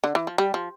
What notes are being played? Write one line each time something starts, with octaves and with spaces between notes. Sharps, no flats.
D3
E3
F3
G3
F3